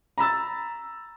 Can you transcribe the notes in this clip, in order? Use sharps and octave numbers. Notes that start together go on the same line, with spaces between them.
A#5 B5 E6 A6